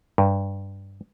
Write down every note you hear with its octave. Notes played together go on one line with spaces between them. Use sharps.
G2